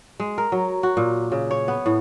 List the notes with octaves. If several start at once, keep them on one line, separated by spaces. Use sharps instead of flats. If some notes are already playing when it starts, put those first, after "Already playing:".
G#3
A#4
F#3
F#4
A#2
C#3
C#5
B3
A2